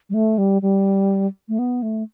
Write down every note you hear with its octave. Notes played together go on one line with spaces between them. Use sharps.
G3
A3
G3
G3
A3
B3
A3